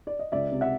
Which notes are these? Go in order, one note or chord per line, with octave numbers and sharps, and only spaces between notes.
D5
D#5
C#2 D5 E5
C3
E5 F#5